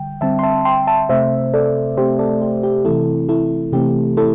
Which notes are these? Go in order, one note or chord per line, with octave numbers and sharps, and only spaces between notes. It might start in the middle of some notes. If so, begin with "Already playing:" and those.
Already playing: D3 G3 G5
D3 G3 C4 E5 A5
C6
E5 A5
G5 C6
E5 A5
C3 A3 C4 C5 E5
A4 D5
C3 A3 C4 G4 C5
A4 D5
G4 C5
G4
C3 E3 A3 C4 E4 A4
E4 A4
C3 E3 A3 C4 G4
E4 A4